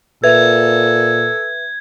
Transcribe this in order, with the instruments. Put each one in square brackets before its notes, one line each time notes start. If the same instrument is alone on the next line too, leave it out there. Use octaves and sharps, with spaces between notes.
[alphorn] A#2 [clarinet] A4 [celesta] B4 E5 [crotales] G#6